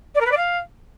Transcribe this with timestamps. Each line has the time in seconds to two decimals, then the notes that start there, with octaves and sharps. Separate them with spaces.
0.15 D5
0.20 A#4
0.26 B4
0.31 D5
0.37 F5